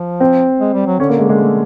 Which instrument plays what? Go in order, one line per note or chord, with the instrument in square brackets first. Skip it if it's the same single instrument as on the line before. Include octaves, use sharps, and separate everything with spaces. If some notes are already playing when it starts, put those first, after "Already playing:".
Already playing: [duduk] F3
[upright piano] C4
[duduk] G#3
G3
F#3
[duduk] D3 [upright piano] C#4
[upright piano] A#3
G#3
G#3
A3